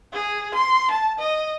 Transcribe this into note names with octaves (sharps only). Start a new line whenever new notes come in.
G#4
C6
A5
D#5